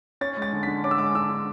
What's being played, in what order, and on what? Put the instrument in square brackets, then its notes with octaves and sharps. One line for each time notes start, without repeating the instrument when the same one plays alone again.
[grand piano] C#4 A6
G#3
A6
D3
D3 B6
C#4 D6
E6
G#3 D6
D3 E6
D3